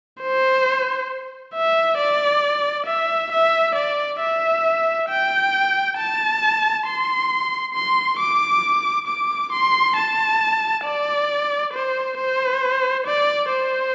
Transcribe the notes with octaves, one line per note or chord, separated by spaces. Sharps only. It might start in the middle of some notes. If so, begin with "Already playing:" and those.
C5
E5
D5
E5
E5
D5
E5
G5
A5
C6
C6
D6
D6
C6
A5
D5
C5
C5
D5
C5